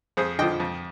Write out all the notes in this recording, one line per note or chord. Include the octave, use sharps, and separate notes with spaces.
F2 G#4 C5
D3 F3 D#5 G5
F2